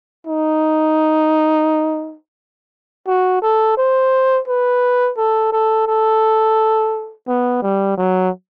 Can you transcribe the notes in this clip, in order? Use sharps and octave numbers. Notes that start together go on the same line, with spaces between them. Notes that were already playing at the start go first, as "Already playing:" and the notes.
D#4
F#4
A4
C5
B4
A4
A4
A4
B3
G3
F#3